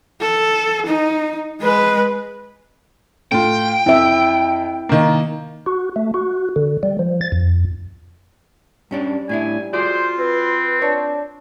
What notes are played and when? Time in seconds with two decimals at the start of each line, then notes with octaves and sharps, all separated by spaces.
0.21 A4
0.86 D#4
1.60 G#3 B4
3.32 A2 F4 G5
3.86 F2 E4 E5
4.89 D#3 A#3
5.66 F#4
5.96 A3
6.14 F#4
6.56 D3
6.83 G3
6.99 F3
7.21 A6
7.32 F2
8.91 G2 G3 C#4 D4
9.29 A2 D4 E4 G#5
9.73 F4 F#4 G#4 C5 D5
10.19 C4 B4
10.82 D4 C#5